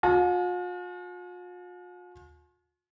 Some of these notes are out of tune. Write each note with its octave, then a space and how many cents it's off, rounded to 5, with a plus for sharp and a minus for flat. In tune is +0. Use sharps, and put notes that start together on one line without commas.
F4 +45 G#5 +45